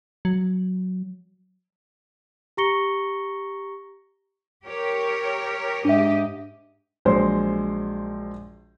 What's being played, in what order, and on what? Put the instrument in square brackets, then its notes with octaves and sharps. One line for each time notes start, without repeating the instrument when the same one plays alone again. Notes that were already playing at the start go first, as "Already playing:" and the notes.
[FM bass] F#3
[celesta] G4 A#5 C#6 A#6 C#7 G7
[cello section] G4 A#4 C#5
[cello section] G#2 G4 D#5 [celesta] D4 E5
[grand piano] A#1 F#3 G#3 C5